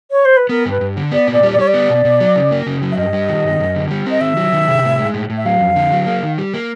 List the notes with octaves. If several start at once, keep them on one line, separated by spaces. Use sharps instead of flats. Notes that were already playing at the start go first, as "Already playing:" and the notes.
C#5
C5
B4
B3 A#4
G2
B4
G2
D3
B3 D5
A#2 D5
G3
D5
G3 C#5
D5
B3
B2
B2
F#3
C#3
A#3
C#3
F#3
E5
G2 D#5
G3
D#3
G2
F#2
D3
G3
C4 D#5
D#3 E5
F#3
D#3
C3
A2
G#3
A2
A2
E5
F#3 F5
F2
D3
F#3
A#3
D#3
G3
A#3